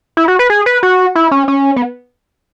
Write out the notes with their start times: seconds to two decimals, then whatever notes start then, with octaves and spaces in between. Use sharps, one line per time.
0.17 E4
0.28 F#4
0.39 B4
0.50 G#4
0.66 B4
0.83 F#4
1.15 E4
1.31 C#4
1.48 C#4
1.76 B3